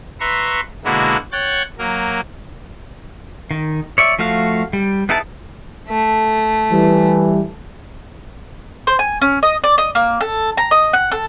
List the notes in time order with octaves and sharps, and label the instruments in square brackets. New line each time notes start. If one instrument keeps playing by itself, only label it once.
[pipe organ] B4 E5 A#5 C6 C#6
B2 D3 G#3 A#3 E4 F#4
C#5 F#5 G5 C#6 F#6 A6
F#3 A#3 A#4
[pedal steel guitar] D#3
C#5 D5 E5
F3 A3 F#4 F5
G3
B3 D#4 E4 G#4 A5
[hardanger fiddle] A3
[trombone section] E3 [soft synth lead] G3
[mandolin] C5
G#5
C#4
D#5
D5
D#5
A#3
A4
A#5
D#5
F#5
A4